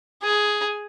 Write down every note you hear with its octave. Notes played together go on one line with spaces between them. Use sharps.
G#4